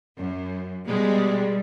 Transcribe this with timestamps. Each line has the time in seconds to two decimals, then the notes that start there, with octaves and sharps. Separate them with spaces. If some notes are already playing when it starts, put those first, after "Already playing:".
0.18 F#2
0.88 B2 G3 G#3